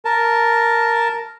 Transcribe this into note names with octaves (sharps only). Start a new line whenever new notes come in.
A#4 A5